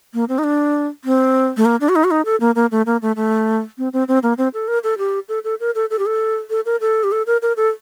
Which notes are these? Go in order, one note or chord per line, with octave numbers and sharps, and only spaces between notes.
A#3
C4
D#4
D4
C4
A3
A#3
D4
F#4
D#4
F#4
D#4
A4
A#3
A#3
A3
A#3
A3
A3
C4
C4
C4
A#3
C4
A4
A#4
A4
G4
A4
A4
A#4
A4
A4
G4
A4
A4
A#4
A4
G4
A4
A#4
A#4
A4